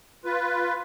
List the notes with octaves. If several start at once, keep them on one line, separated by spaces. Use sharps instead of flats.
F4 B4